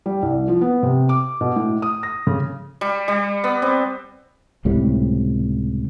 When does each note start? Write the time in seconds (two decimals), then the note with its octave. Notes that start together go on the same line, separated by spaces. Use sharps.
0.06 G3
0.22 C2
0.48 F3
0.61 B3
0.83 C3
1.09 D6
1.41 B2
1.56 A2
1.82 D#6
2.03 A#6
2.27 C#3
2.81 G3
3.08 G3
3.44 B3
3.62 C4
4.65 C#2 A2 C3 G3